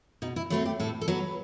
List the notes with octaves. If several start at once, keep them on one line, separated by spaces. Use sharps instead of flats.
B2 D#4
E4
F#3 A3 C4 E4
G4
A2 A4
A4
F#3 B3 B4